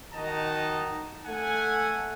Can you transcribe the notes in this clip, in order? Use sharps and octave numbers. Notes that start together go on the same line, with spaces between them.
D#3 D#4 F#4 D#5 A5 A#5
A3 A4 F#5 G#5